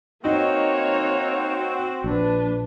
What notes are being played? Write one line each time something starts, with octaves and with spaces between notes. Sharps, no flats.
A#3 C4 D#4 F#4 C#5
A#1 D4 B4